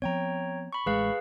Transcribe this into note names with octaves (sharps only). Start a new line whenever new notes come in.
F3 B3 C4 C#5 G5 A#5
B5 C#6
A1 G#3 G#4 B4 F5